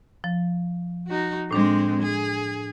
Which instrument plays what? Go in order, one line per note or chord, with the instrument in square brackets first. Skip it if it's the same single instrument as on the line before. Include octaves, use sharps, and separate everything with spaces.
[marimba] F3
[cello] D#4 F#4
[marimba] A2 D4 [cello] G#3 C4
[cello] G#4